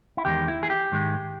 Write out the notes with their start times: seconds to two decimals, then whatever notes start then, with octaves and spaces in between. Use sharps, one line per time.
0.17 E4
0.25 E2 D#3 G#3 G4
0.48 E4
0.63 G#4
0.70 G4
0.92 G#2 D#3 G#3